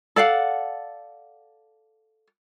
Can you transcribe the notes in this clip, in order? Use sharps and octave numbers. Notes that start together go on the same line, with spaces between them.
A4 D5 F5 F#5